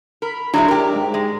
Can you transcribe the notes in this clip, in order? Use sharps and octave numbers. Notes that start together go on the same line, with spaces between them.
A#4 B5
F#3 G#3 D4 E4
G4 A#4
G#2
G#3